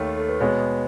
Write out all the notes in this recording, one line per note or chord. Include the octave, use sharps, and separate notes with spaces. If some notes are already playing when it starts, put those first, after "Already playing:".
Already playing: D#2 D#3 A3 C#5
A4
B4
B2 G#3 B3 C#5